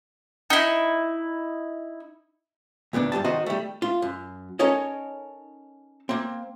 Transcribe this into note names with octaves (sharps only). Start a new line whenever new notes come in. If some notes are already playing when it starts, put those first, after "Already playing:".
D#4 E4
D2 A#2 B3 D4
G2 F#3 G3 A5
D#3 D#4 F#4 C5 D#5
G3 A3
F4
F#2
C#4 D#4 A4 A#4 C#5 D#5
A#3 C4